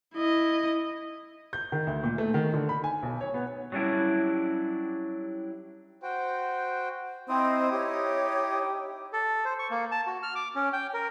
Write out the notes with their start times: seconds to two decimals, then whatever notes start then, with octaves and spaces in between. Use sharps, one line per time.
0.15 E4 D#5
1.53 G6
1.72 D#3
1.87 D2
2.04 A#2
2.18 A3
2.34 D#3
2.54 D3
2.69 B5
2.84 G#5
3.03 B1
3.21 C#5
3.34 B3
3.72 F#3 G3 C#4 D4 E4
6.03 F#4 C5 G5
7.29 C4 D#4 E4 C5 D#5 G5 D#6
7.72 G4 C#5
9.13 A4
9.45 C5
9.59 C#6
9.70 A#3
9.92 A5
10.07 F#4
10.23 F6
10.35 D6
10.55 C#4
10.73 G5
10.94 A#4